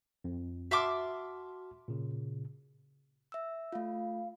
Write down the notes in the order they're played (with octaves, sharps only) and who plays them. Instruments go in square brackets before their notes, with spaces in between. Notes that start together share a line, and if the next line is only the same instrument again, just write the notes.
[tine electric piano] F2
[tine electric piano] F#4 A5 F6 [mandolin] E5 C6 D6
[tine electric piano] A#2 C#3
[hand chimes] E5 E6
[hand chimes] A3 F4 [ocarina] F5